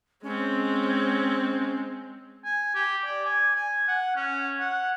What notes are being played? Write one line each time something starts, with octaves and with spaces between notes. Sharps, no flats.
G#3 C4 C#4
G#5
G4
D5
G#5
G#5
F#5
C#4
F#5